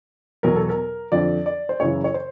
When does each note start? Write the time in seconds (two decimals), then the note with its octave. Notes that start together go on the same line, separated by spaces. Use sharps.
0.43 E2 B2 F#3 A#4
0.56 A4
0.69 A#4
1.12 F2 D3 F3 D5
1.46 D5
1.69 C5
1.80 F#2 C#3 E3 C#5
2.04 C#5
2.14 C5